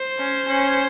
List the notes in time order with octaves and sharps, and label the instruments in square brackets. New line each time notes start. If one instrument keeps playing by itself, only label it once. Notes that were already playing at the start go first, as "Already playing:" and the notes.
Already playing: [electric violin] C5
[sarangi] C#4
C#4